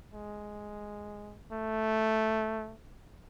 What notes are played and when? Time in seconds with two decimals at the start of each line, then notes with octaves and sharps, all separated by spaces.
0.14 G#3
1.52 A3